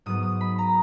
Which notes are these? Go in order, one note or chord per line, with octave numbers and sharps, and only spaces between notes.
G#2 F#3 B3 D#6
D#6
B5
A#5